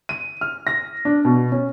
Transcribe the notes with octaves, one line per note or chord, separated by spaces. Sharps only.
D#7
F6
A#6
D4
B2
C#4